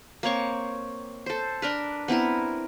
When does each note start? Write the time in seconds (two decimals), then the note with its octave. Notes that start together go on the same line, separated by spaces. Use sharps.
0.23 A#3 C4 C#5 C#6
1.26 A4 C5
1.62 D4 A#4 B4
2.08 B3 C4 E4 A#4